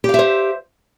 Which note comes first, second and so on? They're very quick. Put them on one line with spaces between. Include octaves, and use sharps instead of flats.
G4 F5 E5 C5